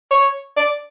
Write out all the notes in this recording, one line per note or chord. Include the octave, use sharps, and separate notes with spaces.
C#5
D5